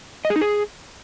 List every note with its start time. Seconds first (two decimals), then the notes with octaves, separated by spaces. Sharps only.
0.25 D#5
0.30 G#4
0.36 D#4
0.41 G#4